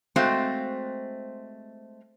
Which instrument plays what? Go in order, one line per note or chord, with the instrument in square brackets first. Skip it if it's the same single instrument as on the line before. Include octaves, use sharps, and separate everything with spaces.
[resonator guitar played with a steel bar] G#3 A3 C4 F#4 C5 F5